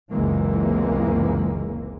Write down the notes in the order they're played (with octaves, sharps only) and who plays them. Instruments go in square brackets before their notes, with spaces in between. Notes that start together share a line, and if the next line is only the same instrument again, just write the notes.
[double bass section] F#1 C#2 C3 E3 G#3 A#3